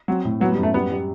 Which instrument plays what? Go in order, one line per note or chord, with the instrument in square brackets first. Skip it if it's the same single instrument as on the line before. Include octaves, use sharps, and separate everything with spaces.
[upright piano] F#3 [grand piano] C4
[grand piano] A2
[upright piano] F#3 [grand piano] B3
[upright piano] G3
[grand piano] F#2
[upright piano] A3
[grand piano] G3 [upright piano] B3
[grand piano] G3